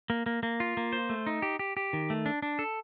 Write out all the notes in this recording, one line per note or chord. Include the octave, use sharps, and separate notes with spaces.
A#3
A#3
A#3
F4
A#3
C5
A3
D#4
G4
G4
G4
D#3
A3
D4
D4
A4